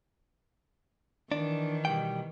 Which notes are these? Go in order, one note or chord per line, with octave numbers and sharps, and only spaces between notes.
D#3 E3 D4
B2 G3 G5